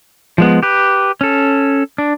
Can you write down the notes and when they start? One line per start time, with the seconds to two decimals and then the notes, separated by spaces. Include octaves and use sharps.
0.38 F3 G#3 B3
0.63 G4 B4
1.21 C#4 A4
1.98 D4